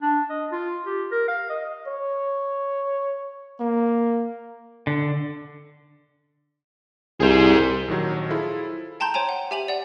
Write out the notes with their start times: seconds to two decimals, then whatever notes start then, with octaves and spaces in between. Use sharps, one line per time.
0.02 D4
0.30 D#5
0.52 F4
0.86 G4
1.12 A#4
1.28 F5
1.50 D#5
1.87 C#5
3.60 A#3
4.87 D3
7.21 C2 G#4 C5
7.88 A#1 D#3 F#3
8.30 E4 F4 G#4 A4 C5
9.00 G5 A5 A#5 C6 G6
9.14 C5 C#5 G5 G#5 A#5
9.29 F#5
9.51 G4 E5 G#5 D#7 F7 F#7
9.68 D5 F#5